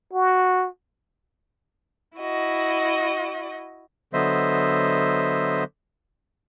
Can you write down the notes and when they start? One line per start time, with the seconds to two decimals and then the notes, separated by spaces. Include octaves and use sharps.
0.13 F#4
2.17 E4 F#4 D#5
4.13 D3 F#3 B3 C5 D#5 E5